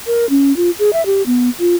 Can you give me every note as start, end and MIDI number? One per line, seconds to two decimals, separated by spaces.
0.07 0.26 70
0.30 0.55 61
0.56 0.70 65
0.79 0.93 68
0.93 1.04 76
1.06 1.22 67
1.26 1.49 59
1.59 1.76 65